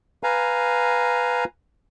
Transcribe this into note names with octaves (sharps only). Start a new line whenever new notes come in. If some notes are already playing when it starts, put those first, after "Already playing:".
B4 F5 G#5 A#5